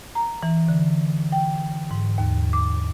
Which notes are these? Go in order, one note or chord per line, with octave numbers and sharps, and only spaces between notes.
A#5
E3
D3
G5
G#2
D#2
D6